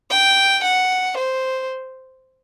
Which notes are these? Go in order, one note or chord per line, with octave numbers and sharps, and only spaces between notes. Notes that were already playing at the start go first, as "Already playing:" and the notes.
G5
F#5
C5